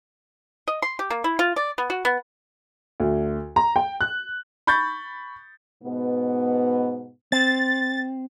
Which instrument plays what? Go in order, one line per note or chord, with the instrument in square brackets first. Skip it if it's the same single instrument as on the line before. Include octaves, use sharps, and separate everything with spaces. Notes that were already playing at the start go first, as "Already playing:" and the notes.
[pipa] D#5
C6
G4
A#3
E4
F4
D5
B3
F#4
B3
[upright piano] D2
A#5
G5
F#6
B5 C#6 G6 A6
[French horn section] G#2 B2 B3
[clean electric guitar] C4 [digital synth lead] A6